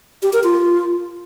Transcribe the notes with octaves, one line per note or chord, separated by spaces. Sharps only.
G4
A#4
F4